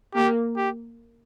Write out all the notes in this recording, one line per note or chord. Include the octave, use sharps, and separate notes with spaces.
A#3 G4
G4